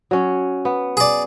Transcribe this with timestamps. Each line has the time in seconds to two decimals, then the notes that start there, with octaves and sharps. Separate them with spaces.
0.11 F#3 C#4
0.65 B3
0.97 G#4 D5